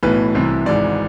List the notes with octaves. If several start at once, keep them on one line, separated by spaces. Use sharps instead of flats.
B1 A2 E3 B4
C2 C3 E3
G#1 G#2 E3 D5